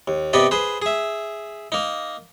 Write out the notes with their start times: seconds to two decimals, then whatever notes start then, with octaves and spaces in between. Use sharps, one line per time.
0.08 D#2
0.33 C3 B3 G4 D5 D#5 B5
0.51 G#4 B4 C5
0.82 G#4 E5
1.72 A#3 D#4